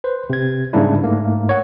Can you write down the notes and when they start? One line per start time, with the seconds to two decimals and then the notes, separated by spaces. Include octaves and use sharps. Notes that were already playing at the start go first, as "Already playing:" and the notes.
0.04 B4 C5
0.30 C3 G#6
0.73 G#2 C#3 G3 A#3 D4 E4
1.04 G#2 A3 A#3
1.49 C#5 F#5